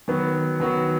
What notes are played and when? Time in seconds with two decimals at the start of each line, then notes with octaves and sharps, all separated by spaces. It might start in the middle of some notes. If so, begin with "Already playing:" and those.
0.08 D#3 F#3 B3 F#4
0.60 D#3 F#3 B3 F#4